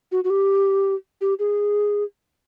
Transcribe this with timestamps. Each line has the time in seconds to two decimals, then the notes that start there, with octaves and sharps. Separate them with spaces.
0.12 F#4
0.24 F#4
0.30 G4
1.21 G4
1.39 G#4